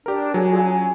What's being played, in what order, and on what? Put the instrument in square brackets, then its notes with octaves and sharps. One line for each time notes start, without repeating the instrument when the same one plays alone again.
[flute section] D4 [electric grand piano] G4 A#4
[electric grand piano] F#3 [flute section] G#4
[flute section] F4 G#4 A4
C#4 G#5